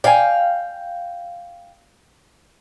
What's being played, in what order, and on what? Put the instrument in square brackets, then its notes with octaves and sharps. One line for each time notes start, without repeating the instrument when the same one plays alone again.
[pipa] D5 G#5 [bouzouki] F5 G5